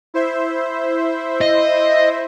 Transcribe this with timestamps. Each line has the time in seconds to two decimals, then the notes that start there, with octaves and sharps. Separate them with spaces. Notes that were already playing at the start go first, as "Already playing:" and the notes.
0.14 E4 C5 E5
1.41 D#5